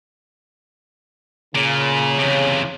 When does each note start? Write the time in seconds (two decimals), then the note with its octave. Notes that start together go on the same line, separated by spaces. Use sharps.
1.55 A#2 C#3
2.19 E2 C3